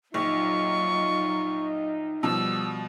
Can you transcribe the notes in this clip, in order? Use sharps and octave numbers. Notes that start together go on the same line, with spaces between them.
A#1 F#3 D#4 F4 C#6
B2 F3 G3 E6